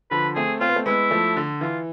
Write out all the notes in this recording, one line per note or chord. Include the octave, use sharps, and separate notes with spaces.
D3 F3 B4
A3 C4 G#4
C4 F4
B3
A3 C4
G#3 B3 E4
F3 A3
D3
E3 F4